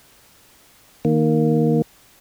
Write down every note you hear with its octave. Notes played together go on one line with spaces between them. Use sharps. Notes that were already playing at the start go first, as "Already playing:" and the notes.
D#3 A#3